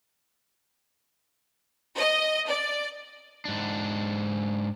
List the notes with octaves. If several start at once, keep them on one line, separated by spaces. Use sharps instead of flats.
D#5
D5
G#2 D4